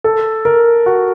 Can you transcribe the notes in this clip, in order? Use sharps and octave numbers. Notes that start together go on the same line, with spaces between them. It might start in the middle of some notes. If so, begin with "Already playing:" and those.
A4
A#4
F#4